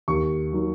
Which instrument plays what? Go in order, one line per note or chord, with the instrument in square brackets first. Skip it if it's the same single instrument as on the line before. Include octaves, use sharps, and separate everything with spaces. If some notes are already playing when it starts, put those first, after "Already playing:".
[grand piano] D#2 C#6
D#3 F#3